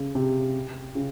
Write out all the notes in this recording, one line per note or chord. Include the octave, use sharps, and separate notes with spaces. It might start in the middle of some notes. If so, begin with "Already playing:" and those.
Already playing: C#3
C3
C#3